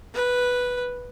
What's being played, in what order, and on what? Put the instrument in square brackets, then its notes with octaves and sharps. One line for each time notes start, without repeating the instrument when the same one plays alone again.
[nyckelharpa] B4